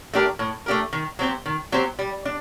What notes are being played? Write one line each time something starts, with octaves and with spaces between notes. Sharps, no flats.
A3 D4 G4 A#4
A2
A3 D4 G4 A#4
D#3
F#3 C4 G4 C5
D#3
F#3 C4 G4 C5
G3
D4